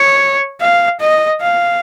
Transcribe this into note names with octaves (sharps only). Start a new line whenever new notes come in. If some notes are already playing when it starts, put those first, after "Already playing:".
Already playing: C#5
F5
D#5
F5